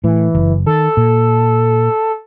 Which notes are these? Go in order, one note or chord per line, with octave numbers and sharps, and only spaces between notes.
A2 E3
F#1
D#3 A4
A#2